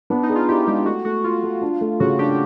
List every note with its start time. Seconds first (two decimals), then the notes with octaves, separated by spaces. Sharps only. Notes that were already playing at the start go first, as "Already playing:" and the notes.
0.10 B3 D4
0.23 D#4
0.30 G#4
0.35 F4
0.48 E4 G4
0.67 G#3 G4
0.86 A3 F#4
1.05 A3 F#4
1.24 A3 F4
1.43 A3
1.62 D4
1.81 A3
2.00 C#3 F#4
2.19 D4 G4